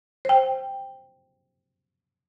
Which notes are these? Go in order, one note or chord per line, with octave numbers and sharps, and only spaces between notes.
C5 G5